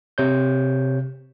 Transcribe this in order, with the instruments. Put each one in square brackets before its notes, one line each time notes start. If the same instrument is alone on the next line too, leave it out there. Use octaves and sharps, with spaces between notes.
[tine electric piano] C3 C#5 G6